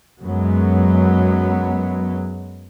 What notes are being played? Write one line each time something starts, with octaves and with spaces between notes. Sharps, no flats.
F#2 F#3 G#3 B3